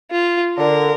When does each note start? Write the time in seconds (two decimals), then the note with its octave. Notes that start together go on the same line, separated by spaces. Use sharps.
0.11 F4
0.58 D3 A#4